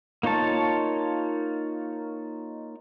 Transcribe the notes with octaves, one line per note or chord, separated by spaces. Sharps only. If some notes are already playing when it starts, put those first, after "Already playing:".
A#3 D#4 F4 C#5 A5